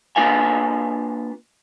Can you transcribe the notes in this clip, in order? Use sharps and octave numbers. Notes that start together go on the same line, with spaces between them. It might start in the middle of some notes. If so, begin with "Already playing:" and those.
A#3 D4 F4 B4 F5 G#5